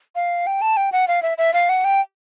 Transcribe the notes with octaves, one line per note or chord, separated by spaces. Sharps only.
F5
G5
A5
G5
F#5
F5
E5
E5
F5
F#5
G5